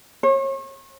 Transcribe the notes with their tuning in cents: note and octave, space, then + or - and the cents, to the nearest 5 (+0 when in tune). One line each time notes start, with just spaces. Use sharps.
C#5 -40